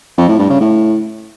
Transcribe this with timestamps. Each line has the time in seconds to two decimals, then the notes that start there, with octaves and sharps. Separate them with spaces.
0.18 F2
0.28 A2
0.39 G2
0.50 C#3
0.60 A2